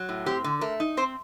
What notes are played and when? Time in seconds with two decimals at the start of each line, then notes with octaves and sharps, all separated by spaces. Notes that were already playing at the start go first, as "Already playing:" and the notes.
Already playing: F#3
0.09 A2
0.26 C4 G4
0.44 D3
0.61 A3 A#4
0.80 D#4
0.97 C4 C5